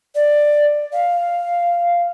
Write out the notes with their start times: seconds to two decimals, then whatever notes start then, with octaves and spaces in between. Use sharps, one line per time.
0.15 D5
0.93 F5